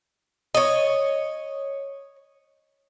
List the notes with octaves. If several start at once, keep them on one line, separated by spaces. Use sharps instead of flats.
C#5 D#5